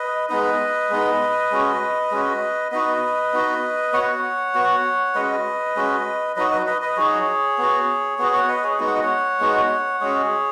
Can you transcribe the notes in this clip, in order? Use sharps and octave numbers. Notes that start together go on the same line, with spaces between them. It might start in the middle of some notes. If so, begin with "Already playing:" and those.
Already playing: B4 D#5
G#3 B3 D#4 B4 D#5
G#3 B3 D#4
G#3 C#4 F#4
G#3 C#4 F#4
B3 D#4 F#4 B4 D#5
B3 D#4 F#4
B3 F#4 C#5 F#5
B3 F#4
G#3 C#4 F#4 B4 D#5
G#3 C#4 F#4
F#3 D#4 F#4 B4 D#5
B4 D#5
B4 D#5
B4 D#5
F#3 D#4 F#4 G#4 C#5
B3 F#4
B3 F#4 G#4
C#5 F#5
B4 D#5
G#4 C#5
G#3 B3 D#4 F#4
F#5
D#5
C#5 F#5
G#3 B3 D#4 F#4
G#3 C#4 F#4 G#4 C#5